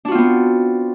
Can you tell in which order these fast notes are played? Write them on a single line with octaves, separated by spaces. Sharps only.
D4 F#4 F4 C4 B3